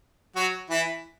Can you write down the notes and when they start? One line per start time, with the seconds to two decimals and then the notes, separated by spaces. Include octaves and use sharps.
0.36 F#3 F#4
0.70 E3 E4